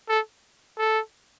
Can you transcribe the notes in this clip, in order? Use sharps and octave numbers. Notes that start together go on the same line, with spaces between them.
A4
A4